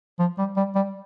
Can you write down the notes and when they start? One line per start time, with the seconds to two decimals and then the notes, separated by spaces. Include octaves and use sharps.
0.19 F3
0.38 G3
0.57 G3
0.75 G3